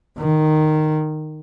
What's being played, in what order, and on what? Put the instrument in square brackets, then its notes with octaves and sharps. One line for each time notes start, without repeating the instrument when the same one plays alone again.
[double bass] D#3